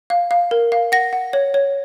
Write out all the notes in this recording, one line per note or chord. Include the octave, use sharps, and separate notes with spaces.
F5
F5
A#4
F5
F#5 A#6
F#5
C#5
C#5